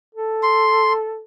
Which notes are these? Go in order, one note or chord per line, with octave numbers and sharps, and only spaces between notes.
A4
C6